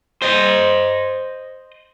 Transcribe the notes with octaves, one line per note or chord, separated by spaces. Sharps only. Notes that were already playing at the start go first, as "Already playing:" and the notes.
C5 D#5